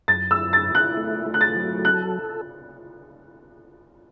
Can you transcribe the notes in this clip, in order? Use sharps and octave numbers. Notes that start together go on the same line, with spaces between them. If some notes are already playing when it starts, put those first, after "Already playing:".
F#2 A6
E6
E4
A6
E4
F#6
A3
A3
F#6
A6
F#3
A4 F#6